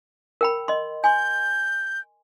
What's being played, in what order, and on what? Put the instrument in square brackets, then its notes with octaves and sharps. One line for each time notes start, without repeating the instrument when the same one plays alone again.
[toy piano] A#4 G5 B5
D#5 C6
[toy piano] G#5 C6 [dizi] G6